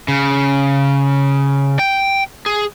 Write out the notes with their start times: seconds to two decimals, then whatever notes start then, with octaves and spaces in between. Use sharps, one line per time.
0.08 C#3
1.79 G5
2.46 G#4